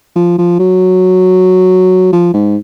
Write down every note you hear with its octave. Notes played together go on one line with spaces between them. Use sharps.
F3
F3
F#3
F3
G#2